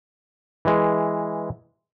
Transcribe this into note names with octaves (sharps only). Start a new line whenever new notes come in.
E3 G#3